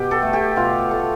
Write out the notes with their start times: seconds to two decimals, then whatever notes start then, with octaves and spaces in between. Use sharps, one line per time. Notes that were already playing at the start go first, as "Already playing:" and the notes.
Already playing: B2 G4
0.11 A4
0.22 A3
0.33 G4
0.56 B2 F4
0.91 A3